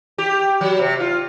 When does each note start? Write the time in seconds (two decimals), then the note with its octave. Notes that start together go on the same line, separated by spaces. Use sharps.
0.18 G4
0.61 F#3
0.79 C3
1.00 F4